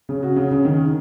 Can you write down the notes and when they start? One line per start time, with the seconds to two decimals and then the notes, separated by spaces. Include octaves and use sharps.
0.09 C#3
0.23 F#4
0.36 C#3
0.51 C#3
0.65 D#3